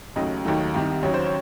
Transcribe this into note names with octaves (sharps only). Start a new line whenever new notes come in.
D#2 C#3 F#3 A3 D#5
D#2 D#3 F#3 A3
C2 C3 D#3
D#2 C#3 F#3 C#5
C5
C#5